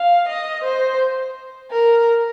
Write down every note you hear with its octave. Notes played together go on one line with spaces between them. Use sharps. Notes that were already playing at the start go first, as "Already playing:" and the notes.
Already playing: F5
D#5
C5
A#4